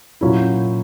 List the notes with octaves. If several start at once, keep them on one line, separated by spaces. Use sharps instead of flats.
A#2 F#3 C#4 E4